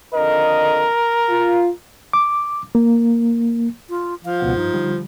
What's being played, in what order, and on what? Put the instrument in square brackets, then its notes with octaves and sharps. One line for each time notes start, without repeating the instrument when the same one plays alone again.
[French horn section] F2 D3 D#5 [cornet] A#4
[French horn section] F4
[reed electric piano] D6
A#3
[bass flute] F4
[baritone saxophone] F3 [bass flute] F5
[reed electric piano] C#2 B2 F#5
[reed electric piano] G2 [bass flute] D#4
[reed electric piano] D3 G3